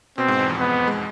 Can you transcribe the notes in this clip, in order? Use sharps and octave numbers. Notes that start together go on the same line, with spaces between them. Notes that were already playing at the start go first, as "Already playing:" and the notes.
B2 C4
G#2
E2
F2
B3
G#3